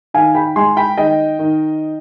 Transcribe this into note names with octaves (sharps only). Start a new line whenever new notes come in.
D#3 F5 G#5
G5 B5
G#3 G#5 C6
G5 B5
D#3 D#5 G5
D#3